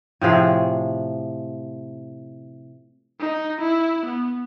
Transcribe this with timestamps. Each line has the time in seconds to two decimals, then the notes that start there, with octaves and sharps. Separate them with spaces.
0.21 A2 C3 F3 G#4
3.20 D#4
3.61 E4
4.06 B3